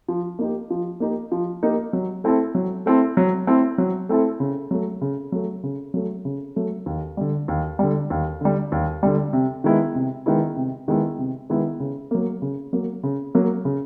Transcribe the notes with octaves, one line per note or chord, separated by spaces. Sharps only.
F3
A#3 D#4 G4
F3
A#3 D#4 G4
F3
A#3 D#4 G4
F#3
A3 C4 E4 A4
F#3
A3 C4 E4 A4
F#3
A3 C4 E4 A4
F#3
A3 C4 E4 A4
C#3
F#3 A3
C#3
F#3 A3
C#3
F#3 A3
C#3
F#3 A3
D#2
D3 G3
D#2
D3 G3
D#2
D3 G3
D#2
D3 G3
C3
D#3 G#3 B3 E4
C3
D#3 G#3 B3 E4
C3
D#3 G#3 B3 E4
C3
D#3 G#3 B3 E4
C#3
F#3 A#3
C#3
F#3 A#3
C#3
F#3 A#3
C#3